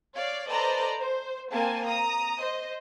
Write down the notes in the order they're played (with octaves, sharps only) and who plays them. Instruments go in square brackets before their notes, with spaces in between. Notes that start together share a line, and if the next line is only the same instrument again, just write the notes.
[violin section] C#5 D5 F5
A4 B4 C5 D5 D#5 A#5
C5
A#3 C4 G#5 A5
A#5 D#6
C5 D#5